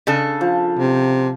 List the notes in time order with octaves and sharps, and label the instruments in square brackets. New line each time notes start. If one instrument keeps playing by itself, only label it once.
[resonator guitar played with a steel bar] C#3 D4 A4
[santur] F3
[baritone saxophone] C3